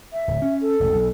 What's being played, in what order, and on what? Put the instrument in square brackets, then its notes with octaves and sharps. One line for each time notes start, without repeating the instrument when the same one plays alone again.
[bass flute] E5
[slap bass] D1
C#4
[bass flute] A4
[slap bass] E1 A1
B1